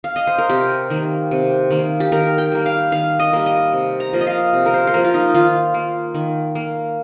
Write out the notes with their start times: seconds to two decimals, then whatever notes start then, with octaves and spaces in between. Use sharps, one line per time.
0.04 F5
0.16 D#5
0.27 C5
0.38 A#4
0.49 C3 G4
0.90 D#3 A#3
1.31 C3
1.70 D#3 A#3
2.00 G4
2.12 D#3 A#4
2.38 G5
2.52 G3 A#3
2.66 F5
2.92 D#3 F5
3.19 D#5
3.33 G3 A#3
3.46 D#5
3.73 C3
4.00 A#5
4.13 F3 A#3
4.21 D#5
4.27 F5
4.53 C3
4.66 A#4
4.74 C5
4.87 C5
4.94 F3 A#3 A#4
5.04 F4
5.14 D#4
5.34 D#3 F4
5.74 A#3
6.14 D#3
6.55 A#3